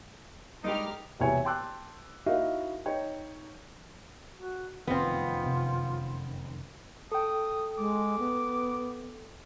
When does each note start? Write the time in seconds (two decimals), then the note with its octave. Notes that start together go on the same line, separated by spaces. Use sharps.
0.64 G2 G#3 D#4 G4 A#4 D6 F6
1.19 E1 C2 F#4 C#5 E5 G#5
1.45 G5 A5 C6 D6 E6 F#6
2.26 D#4 E4 F#4 A#4 E5 F5
2.86 D#4 C#5 G5
4.36 F#4
4.87 F1 F#2 D#3 B3 C4 F4
5.46 C3
7.12 A4 G5 D#6
7.78 G#3 D6
8.19 B3